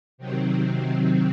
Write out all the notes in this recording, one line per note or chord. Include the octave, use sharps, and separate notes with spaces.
C3 D#3 F#3 C4